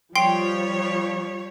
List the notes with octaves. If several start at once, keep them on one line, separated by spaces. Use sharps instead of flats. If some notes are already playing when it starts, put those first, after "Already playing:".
F3 G3 C#5 G5 C6 C7